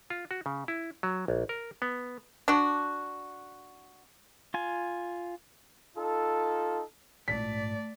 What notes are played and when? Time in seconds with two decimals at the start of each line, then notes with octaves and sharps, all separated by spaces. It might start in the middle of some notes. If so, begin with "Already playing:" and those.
0.10 F4
0.31 F#4
0.46 C#3
0.68 E4
1.03 F#3
1.28 A#1
1.49 A#4
1.82 B3
2.48 D4 F#4
4.54 F4 G#5
5.97 D#4 F4 A4
7.28 A#1 G#2 A3 D5 B6